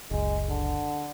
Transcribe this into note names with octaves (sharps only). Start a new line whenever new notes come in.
F#1 C#2 G#3
D3